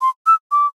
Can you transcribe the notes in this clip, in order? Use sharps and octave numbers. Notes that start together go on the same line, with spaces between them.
C6
E6
D6